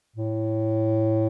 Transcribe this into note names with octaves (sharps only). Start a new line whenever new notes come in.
A2